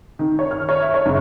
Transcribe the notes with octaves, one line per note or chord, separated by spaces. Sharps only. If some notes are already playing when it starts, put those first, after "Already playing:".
D#3
C#5
F6
C#5
E5
C#5
F#1